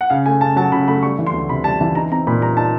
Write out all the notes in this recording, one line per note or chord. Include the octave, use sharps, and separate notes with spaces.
F#5
C#3 F5
A3 G#5
C#3 A5
F#3 A5
C#3 B5
A3 B5
G3 C#6
E3
C6
D2
C3 B5
G3 A5
E3 A5
D#4 A#5
C4 A#5
A#2 B5
G3 A#5
D#4 A5